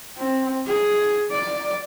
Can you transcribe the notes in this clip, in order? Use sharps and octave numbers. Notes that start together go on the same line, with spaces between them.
C4
G#4
D5